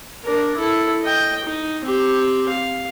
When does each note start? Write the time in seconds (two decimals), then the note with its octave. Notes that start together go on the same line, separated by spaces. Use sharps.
0.24 D4 A#4
0.57 E4 A4
1.02 D#5 G5
1.45 D#4
1.84 C4 G4
2.49 F5